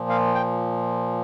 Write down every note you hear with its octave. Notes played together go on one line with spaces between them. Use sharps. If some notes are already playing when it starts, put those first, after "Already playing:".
Already playing: A#2 F3
F5
G5